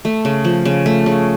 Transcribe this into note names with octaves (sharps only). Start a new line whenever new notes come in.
A3
C#3
F3
C#3
A3
C#3